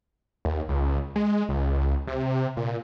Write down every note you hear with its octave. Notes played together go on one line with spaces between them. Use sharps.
D#2
C#2
G#3
C#2
C3
A#2